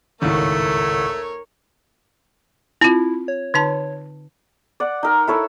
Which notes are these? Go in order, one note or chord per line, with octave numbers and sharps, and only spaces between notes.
G#1 C#2 A2 A3 A#4 C#5
C4 E4 F4
C#5
D3 D#4 A5
D5 F#5
D#4 A#4
E4 A4 C#5